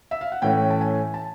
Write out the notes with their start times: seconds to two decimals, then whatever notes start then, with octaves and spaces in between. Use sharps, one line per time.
0.11 E5
0.21 F5
0.32 F#5
0.42 A2 E3 A3 C#4 G5
0.70 A5
0.81 G#5
1.14 A5